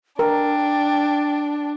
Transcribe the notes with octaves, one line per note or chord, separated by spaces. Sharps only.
D4 A#4 G5